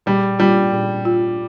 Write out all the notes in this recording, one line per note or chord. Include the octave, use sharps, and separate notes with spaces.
A#2 G3
G3 F4
A#2
F4